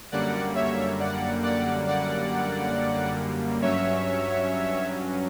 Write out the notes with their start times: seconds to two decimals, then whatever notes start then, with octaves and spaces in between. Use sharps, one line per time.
0.12 F#2 D3 G3 A#3 D5 F#5
0.55 C#5 E5
0.99 D5 F#5
1.43 D5 F#5
1.87 D5 F#5
3.62 G2 F#3 C#4 C#5 E5